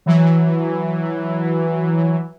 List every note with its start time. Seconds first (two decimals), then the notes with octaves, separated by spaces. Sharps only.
0.06 E3 F#3